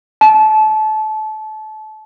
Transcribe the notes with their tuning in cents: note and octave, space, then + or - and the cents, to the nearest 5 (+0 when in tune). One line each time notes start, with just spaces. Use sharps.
A5 -25